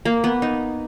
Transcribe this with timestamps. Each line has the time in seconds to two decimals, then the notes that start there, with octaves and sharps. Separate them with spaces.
0.05 A#3
0.24 B3
0.42 D#4